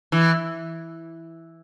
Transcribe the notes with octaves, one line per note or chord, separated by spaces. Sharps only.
E3